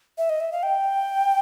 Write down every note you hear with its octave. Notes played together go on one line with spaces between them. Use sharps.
E5
D#5
E5
F5
G5